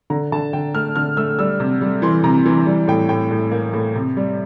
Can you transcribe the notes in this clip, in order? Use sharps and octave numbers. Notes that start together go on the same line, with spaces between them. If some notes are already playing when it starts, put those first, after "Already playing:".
D3 A#5
D3 A5
D3 G5
A3 F6
D3 F6
A3 E6
G3 E6
C3
G3
E3 C6
C3 A#5
E3
G3
A2 G5
A2 G5
A2
A#3
A2
C3
G3